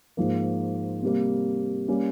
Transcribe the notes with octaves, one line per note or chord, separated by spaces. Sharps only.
G#2 F3 A#3
C3 G3 A#3
G3 A#3 C#4